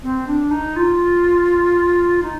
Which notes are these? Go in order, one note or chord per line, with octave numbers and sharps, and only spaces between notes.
C4
D4
D#4
F4
D#4